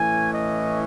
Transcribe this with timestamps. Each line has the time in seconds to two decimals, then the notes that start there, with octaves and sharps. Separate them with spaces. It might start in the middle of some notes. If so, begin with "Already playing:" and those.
Already playing: A2 E3 A3 C#4 G#5
0.33 D#5